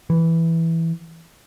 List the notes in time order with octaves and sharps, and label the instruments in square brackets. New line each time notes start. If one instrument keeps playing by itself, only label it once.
[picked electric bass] E3